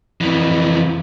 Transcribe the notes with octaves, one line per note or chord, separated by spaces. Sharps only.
F2 E3